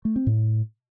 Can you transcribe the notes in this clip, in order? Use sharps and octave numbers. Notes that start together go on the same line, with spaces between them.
A3
C4
A2